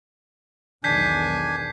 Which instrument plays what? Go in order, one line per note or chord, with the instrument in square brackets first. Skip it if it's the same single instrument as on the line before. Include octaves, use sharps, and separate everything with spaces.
[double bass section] B1 E2 D#3 [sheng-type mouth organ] D4 G#5 [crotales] G6 B6 C7